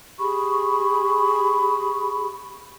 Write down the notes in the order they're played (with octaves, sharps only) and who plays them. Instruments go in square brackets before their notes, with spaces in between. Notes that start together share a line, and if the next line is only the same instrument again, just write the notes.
[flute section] G4 G#4 B5 C#6